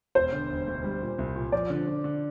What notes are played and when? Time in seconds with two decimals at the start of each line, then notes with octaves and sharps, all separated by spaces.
0.15 E1 C5
0.32 D3
0.50 E1
0.67 D2
0.84 G3
1.02 A#2
1.18 C2
1.36 A#2
1.52 F3 D5
1.70 D3
1.87 D3
2.04 D3